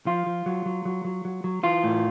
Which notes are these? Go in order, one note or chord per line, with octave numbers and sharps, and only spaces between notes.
F3 F4
F3
F#3
F#3
F#3
F#3
F#3
F#3
E3 F4
A2